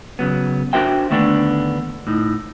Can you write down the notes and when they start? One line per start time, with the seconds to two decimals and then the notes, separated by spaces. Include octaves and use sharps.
0.19 C#3 F#3 B3
0.73 D4 F#4 A#4 C5 E5 G5
1.10 D#2 D3 A3 B3 D4
2.07 A2 D#4